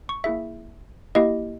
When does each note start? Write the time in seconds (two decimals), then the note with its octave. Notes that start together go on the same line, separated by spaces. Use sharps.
0.09 C#6
0.24 A#3 E4 G#4 E5
1.15 A#3 E4 G4 D#5